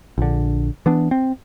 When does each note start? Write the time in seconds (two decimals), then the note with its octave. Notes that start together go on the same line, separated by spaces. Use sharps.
0.18 A#1 D3
0.86 E3 B3 D4
1.11 C4